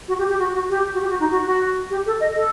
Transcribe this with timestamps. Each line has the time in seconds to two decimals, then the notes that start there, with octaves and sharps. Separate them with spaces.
0.08 F#4
0.19 G4
0.29 G4
0.39 F#4
0.54 F#4
0.70 G4
0.94 F#4
1.00 G4
1.10 F#4
1.20 D#4
1.31 F#4
1.46 F#4
1.91 G4
2.06 A4
2.20 D#5
2.36 A4